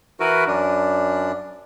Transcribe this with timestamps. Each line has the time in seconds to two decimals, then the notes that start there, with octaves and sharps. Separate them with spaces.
0.20 E3 E4 F#4 A#4 B4
0.47 F#2 D4